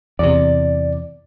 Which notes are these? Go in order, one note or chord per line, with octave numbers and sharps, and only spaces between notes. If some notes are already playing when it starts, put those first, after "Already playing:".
E2 C3 D5